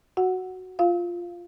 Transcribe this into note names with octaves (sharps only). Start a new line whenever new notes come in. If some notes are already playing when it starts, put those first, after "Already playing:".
F#4 F#5
F4 F5